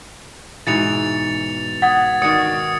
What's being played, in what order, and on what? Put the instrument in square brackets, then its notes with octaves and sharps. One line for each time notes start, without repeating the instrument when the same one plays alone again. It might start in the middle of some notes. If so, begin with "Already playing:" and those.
[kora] G#2 B2 E3 [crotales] A6 C#7 F7
[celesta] F#5 [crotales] D#6 G#6 A6
[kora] D#3 F#4 D5 [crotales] D#6 C#7